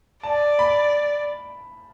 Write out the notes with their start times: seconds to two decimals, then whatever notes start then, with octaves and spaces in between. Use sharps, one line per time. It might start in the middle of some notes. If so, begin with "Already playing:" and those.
0.23 D5 A5
0.59 B5